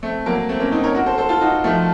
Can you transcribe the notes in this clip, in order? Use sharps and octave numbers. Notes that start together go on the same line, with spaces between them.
A3 C4
F#3 A#3
A3 C4
A#3 C#4
C4 D#4
A#4 C#5
F#4 A#4
A4 C5
A4 C5
F4 A4
D#4 F#4
F3 A3